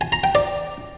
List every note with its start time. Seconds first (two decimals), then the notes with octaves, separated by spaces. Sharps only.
0.01 G#5
0.12 A#5
0.24 G5
0.35 D5